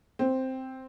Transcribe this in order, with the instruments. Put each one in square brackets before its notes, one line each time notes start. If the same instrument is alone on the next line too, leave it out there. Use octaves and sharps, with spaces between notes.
[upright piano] C4